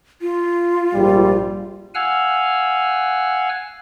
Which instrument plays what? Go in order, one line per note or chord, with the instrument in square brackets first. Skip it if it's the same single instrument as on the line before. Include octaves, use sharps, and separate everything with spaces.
[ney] F4
[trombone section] A#1 G#2 G3
[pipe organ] F5 F#5 G#5 E6 F6